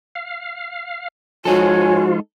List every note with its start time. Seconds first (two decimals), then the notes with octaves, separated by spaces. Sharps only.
0.15 F5
1.45 F3 G#3 D#4 F4 F#4 A4 C#5 G#5